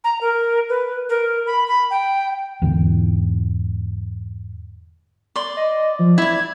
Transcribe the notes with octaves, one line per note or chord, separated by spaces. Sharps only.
A#5
A#4
B4
A#4
B5
B5
G5
E2 G#2 D3
D5 C6
D#5
F3
E4 D5 G#6